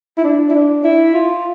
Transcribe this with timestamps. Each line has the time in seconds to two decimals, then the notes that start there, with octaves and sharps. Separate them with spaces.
0.18 E4
0.24 D4
0.50 E4
0.54 D4
0.84 E4
1.15 F4